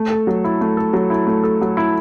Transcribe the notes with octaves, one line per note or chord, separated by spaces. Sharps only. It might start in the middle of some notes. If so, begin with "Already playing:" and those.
Already playing: A3
A4
F#3
E4
A3
A4
F#3
E4
A3
A4
F#3
E4